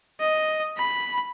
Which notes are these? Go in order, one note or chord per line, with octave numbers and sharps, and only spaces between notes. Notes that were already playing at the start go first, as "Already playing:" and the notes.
D#5
B5